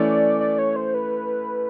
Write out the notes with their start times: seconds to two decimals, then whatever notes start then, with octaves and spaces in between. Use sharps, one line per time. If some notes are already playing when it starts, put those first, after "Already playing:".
Already playing: E3 A3 C#4 D5
0.40 D5
0.59 C#5
0.76 C5
0.94 B4